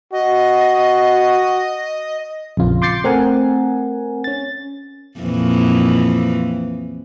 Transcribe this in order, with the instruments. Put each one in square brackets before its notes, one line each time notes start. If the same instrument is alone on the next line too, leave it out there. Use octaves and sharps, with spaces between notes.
[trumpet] F#4 [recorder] D#5
[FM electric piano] A#1 F2 C#3 F4
C6 D6 G6 A6 C7 C#7
A3 C4 A#4 F#5 G#5
C#4 A6
[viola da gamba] F2 A#2 E3